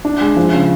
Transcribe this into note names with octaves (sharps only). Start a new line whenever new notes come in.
D4
G#3
F3
C#3